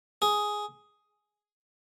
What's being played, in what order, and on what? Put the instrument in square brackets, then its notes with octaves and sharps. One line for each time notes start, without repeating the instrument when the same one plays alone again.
[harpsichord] G#4